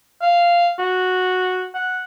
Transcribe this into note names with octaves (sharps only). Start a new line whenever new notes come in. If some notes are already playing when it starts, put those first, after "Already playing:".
F5
F#4
F#5